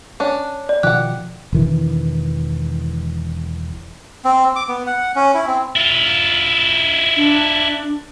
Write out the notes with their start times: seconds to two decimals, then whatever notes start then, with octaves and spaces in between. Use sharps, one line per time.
0.20 C#4 D4
0.69 D5
0.83 B2 D#3 F3 G4 F#5 F#6
1.53 E1 D#3 E3
4.25 C4
4.56 D6
4.69 B3
4.87 F#5
5.15 C#4
5.34 E4
5.47 C4
5.76 E4 F4
7.17 D4